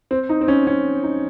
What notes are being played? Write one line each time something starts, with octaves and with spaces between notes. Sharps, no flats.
C4
D#4
C4
C#4
C#4
D#4